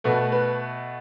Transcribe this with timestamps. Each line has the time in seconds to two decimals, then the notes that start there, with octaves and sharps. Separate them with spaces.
0.04 B2 A3 B4
0.32 B4